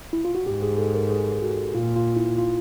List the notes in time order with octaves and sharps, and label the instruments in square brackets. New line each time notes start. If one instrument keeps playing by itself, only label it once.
[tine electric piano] E4
F4
F#4
[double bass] G#2 [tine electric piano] G4
[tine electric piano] G#4
A4
A#4
G#4
F#4
[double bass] A#2 [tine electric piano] F4
[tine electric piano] F4
E4
F4